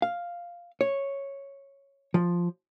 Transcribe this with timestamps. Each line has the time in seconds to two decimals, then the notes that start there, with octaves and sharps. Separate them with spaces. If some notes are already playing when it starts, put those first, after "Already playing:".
0.02 F5
0.81 C#5
2.14 F3